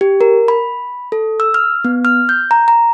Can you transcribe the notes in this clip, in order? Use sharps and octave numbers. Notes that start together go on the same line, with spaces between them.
G4
A#4
B5
A4
E6
F6
B3
F6
G6
A#5
A#5